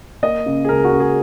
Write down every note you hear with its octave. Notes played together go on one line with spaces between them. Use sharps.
A#3 D#5
C#3
G#4
C#2 A#4
F#4
C#2
G#4